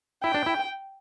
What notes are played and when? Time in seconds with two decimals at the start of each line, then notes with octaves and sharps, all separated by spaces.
0.24 E4 G5
0.34 D4
0.46 E4